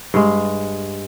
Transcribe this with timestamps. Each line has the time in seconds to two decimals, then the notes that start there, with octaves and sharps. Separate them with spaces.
0.14 G2 G#3